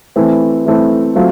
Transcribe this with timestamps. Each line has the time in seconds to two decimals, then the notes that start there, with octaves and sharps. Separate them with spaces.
0.16 E3 A3 C4 E4
0.66 E3 A3 C4 E4
1.15 F#3 A3 C4 F4